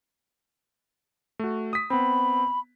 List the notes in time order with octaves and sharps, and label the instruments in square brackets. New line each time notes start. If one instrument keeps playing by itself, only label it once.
[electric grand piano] A3 F#4
D#6 B6
[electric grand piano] B3 C4 [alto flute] B5